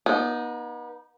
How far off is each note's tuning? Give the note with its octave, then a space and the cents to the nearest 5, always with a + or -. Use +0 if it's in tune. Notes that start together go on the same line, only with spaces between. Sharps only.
B3 -35 D#4 +0